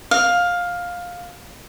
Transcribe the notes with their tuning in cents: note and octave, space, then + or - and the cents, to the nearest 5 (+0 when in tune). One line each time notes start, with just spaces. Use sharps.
F5 +15